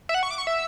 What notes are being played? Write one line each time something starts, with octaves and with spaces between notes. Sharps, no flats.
E5
F#5
C#6
D6
C#6
E5